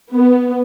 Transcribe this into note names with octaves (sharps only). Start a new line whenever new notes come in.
B3